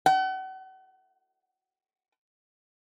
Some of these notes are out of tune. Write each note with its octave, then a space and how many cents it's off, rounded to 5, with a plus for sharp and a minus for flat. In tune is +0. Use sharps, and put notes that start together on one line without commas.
F#5 +40